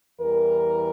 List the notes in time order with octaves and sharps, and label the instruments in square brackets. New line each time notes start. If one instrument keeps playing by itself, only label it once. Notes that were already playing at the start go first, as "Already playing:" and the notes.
[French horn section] E2 E3 G3 A#4